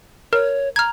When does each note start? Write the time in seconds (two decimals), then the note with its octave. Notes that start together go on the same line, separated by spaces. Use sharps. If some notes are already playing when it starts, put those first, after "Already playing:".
0.33 A#4 C#5
0.76 A#5 F6 G#6